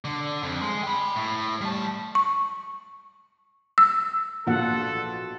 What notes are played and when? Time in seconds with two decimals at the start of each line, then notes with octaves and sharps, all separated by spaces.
0.05 D3
0.43 F2
0.61 G#3
0.83 G5 B5
1.16 A2
1.61 G3 A5
2.15 C#6
3.78 E6
4.47 A#1 B2 E3 A#3 F4 A4 F#5